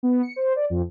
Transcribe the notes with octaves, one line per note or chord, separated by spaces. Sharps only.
B3
C#7
C5
D5
F2